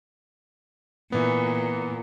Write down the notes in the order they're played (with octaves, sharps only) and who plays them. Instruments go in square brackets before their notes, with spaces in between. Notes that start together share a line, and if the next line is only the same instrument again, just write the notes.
[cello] A#2 [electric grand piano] E3 B3